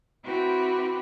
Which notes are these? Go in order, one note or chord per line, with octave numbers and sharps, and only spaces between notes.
C4 E4 F#4 G4 B4